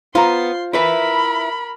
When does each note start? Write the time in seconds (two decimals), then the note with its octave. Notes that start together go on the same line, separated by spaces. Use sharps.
0.15 B3 F4 C5 A#5 C6
0.73 E4 A#4 B4 E5 B5